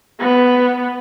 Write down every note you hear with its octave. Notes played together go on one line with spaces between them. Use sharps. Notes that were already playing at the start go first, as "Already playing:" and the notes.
B3